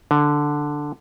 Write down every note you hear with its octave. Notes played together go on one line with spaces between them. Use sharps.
D3